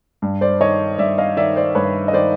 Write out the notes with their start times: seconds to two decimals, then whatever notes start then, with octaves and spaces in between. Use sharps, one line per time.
0.22 G2
0.41 C5 D5
0.60 D#3 C#5 D#5
0.98 G2 D5 E5
1.18 D#5 F5
1.37 D#3 D5 E5
1.56 C5 D5
1.75 G2 B4 C#5
2.08 D#5
2.13 D#3 C5 D5